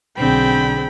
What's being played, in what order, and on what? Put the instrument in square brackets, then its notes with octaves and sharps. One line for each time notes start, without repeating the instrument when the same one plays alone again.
[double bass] B1 D3 [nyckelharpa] C4 G#4 [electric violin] G5 B5